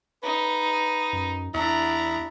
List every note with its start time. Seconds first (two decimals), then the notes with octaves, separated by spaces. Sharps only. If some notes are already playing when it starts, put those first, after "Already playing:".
0.23 D#4 B4
1.13 F#2
1.54 E2 D4 E4 A#5